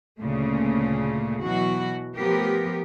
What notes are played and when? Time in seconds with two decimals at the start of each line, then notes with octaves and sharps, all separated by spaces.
0.19 D2 A#2 C#3 A3 A#3
1.42 B2 E3 F#3 F#4
2.16 F3 A3 B3 G4 A#4